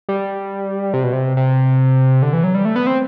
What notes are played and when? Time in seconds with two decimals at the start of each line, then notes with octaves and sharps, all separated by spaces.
0.09 G3
0.94 C3
1.04 B2
1.13 C3
1.37 C3
2.22 D3
2.33 E3
2.44 F#3
2.55 G3
2.65 A3
2.76 B3
2.87 C4